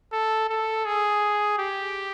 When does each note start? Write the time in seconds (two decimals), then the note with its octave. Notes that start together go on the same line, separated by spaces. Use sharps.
0.13 A4
0.49 A4
0.86 G#4
1.59 G4